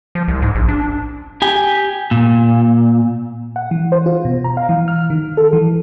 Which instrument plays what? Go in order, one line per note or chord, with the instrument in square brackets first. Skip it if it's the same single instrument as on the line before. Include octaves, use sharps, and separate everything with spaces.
[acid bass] F3
C2
G#2
A#1
D4
[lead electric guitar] G4 G#5
A#2
[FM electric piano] F#5
E3
C5
F4
B2
A#5
F5
E3
F6
D#3
A4
E3